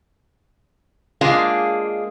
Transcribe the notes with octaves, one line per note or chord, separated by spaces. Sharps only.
G#3 A#3 D4 F4 G#4